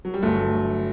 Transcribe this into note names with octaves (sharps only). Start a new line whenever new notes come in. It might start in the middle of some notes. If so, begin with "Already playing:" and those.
F#3
G3
G1 F#3 A3